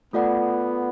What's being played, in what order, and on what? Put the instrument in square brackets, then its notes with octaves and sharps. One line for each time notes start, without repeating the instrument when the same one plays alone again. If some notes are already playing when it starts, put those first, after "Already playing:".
[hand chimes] A3 F4 A4 D5 F#5 [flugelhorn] B3